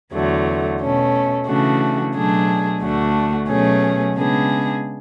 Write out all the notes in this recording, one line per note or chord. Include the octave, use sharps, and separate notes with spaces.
E2 D3 F#3 A3
B2 A3 C#4
C#3 E3 A3 D4 F#4
B2 F#3 A3 D4 G#4
D2 D3 A3 D4 F#4
B2 F#3 A3 C#4 G#4
C#3 G#3 B3 D4 G#4